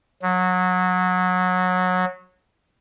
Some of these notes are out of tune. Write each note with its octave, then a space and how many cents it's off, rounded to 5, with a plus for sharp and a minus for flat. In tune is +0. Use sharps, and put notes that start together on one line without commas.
F#3 -20